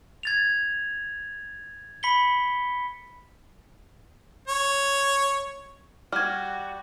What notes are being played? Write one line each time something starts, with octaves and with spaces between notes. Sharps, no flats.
G#6 A6 F7
B5 B6 C#7 G7
C#5
G3 F#4 F6 G#6